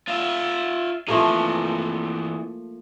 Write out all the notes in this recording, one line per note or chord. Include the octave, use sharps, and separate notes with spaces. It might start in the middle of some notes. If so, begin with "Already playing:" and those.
F4 E5
E3 F3 A3 A#3 C4